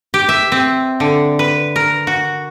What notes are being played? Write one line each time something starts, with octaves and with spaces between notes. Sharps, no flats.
G4
E5
C4
D3
B4
A#4
F#4